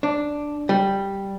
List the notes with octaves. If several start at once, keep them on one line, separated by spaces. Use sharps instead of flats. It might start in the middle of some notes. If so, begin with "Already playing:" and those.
D4
G3